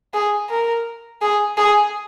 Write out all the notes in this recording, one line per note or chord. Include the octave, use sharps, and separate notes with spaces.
G#4
A#4
G#4
G#4